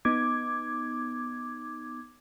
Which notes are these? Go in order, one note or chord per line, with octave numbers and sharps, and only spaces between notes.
B3 D#4 D6 G#6